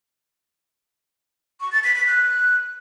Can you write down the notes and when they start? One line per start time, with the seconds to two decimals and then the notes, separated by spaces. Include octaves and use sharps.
1.60 C#6
1.72 A6
1.84 B6
1.95 B6
2.07 F#6